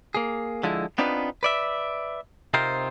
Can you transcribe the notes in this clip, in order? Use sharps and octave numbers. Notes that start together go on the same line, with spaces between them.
A#3 G#4
D3 F3 G#3 E4
B3 C4 D4 D#4 F4 B4
B4 D5 E5
C3 C4 D#4 F4 A#4 C5